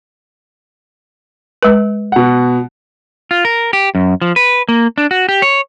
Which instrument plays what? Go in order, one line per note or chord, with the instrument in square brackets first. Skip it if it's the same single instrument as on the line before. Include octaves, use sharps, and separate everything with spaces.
[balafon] G#3 B4
[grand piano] B2 F#5
[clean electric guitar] F4
A#4
G4
F#2
F3
B4
A#3
D4
F#4
G4
C#5